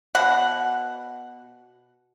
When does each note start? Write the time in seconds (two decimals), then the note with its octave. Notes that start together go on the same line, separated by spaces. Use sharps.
0.15 B2 F#5